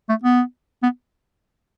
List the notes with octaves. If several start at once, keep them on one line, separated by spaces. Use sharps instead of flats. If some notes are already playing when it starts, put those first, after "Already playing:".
A3
B3
B3